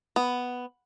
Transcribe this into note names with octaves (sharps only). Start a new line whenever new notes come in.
B3